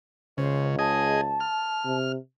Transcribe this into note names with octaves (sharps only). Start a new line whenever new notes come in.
C#2 C#3 C5
G#4 D#5 A5
F6
C3